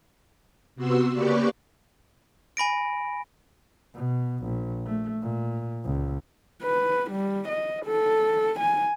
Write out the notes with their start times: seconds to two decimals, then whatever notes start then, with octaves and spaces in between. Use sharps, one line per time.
0.75 C3 B3 F#4 C6 E6
1.13 C#3 A#3 G4 B4 D5 C#6
2.57 G#5 B5 A#6 D7
3.94 B2
4.44 A#1
4.86 A3
5.22 A#2
5.84 C#2
6.63 B4
7.11 G3
7.48 D#5
7.85 A4
8.60 G#5